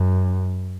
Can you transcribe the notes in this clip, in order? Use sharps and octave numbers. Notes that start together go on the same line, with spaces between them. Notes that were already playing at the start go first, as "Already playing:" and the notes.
Already playing: F#2